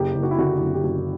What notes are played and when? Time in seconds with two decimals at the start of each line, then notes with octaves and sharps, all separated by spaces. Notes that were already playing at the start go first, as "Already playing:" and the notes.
Already playing: F#1 G4
0.15 F#1
0.23 F#4
0.31 E4
0.39 D3 F#4
0.53 E4
0.61 F#1
0.74 G4
0.84 F#1 F#4